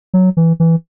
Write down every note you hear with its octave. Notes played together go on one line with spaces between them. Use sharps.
F#3
E3
E3